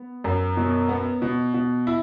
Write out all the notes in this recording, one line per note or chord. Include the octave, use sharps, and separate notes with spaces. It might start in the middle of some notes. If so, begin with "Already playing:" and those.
Already playing: B3
F#2
B2
B3
B2
B2
E4